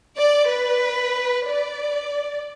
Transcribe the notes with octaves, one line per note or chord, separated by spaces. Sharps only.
D5
B4
D5